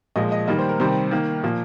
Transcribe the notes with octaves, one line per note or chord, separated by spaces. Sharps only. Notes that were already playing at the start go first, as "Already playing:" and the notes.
A#2 F3 G#3 D#5
D#5
D#3 G3 A#3 D#5
C5
A#4
C3 D#3 G3 C5
D#3 A#3
A#2 F3 A#3